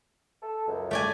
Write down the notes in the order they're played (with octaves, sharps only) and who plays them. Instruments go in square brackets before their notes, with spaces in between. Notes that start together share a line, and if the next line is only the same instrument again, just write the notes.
[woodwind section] A4
C#2 F#2
[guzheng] A3 D5 G#5